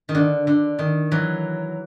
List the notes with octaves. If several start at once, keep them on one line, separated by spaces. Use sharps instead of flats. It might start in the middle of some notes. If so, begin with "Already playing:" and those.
D#3
D3
D3
D#3
E3 F#3